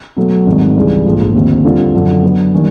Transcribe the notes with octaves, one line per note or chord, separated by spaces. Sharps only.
B2 F#3 A3
G#1 G#2 D#3 G3
C#2 C#3 E3 G3
A#1 G#2 F3 A3
D#2 D3 F3 A3 C4
D3 G3 C4 F4
F#2 D3 F3
D3 F#3 B3
D#3 G3 A#3 C#4